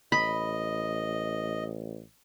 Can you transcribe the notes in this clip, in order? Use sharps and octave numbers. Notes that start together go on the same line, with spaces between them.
A1 D#5 B5